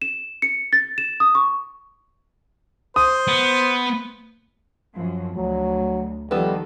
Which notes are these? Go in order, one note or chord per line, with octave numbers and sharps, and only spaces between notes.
E7
C#7
A6
E7
D#6
C#6
C5 D#6
B3
F#2 F3
D2 F#3
D#3 F3 G3 B3 A4